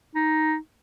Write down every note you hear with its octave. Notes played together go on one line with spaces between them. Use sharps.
D#4